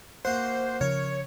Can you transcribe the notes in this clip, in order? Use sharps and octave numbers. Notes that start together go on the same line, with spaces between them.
A#3 F#4 C5 F#5
C#3 F3 A#4 C#5